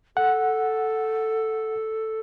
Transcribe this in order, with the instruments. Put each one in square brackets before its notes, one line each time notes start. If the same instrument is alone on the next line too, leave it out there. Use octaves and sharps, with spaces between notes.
[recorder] A4 [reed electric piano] F#5